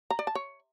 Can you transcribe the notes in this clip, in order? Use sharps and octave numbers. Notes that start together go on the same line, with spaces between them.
A#5
D5
A5
C#5